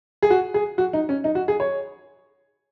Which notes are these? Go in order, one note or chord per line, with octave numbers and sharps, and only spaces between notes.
G#4
F#4
G#4
F#4
D#4
C#4
D#4
F#4
G#4
C#5